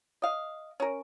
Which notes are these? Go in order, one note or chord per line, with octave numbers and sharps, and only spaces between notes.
D#5 F5
C#4 A#4